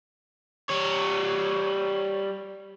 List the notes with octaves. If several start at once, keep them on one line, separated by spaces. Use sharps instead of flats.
G3 C#5